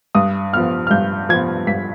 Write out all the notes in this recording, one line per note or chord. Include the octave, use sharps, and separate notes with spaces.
G2 D#6
F3 B3 F6
F6
G2 G6
F3 B3 G#6
G2 B6